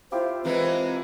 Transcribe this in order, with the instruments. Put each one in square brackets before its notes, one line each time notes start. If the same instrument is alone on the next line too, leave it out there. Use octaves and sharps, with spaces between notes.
[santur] E4 F4 G4 [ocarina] C5
[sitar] E3 G#3 A#3 [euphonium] C4 [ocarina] B4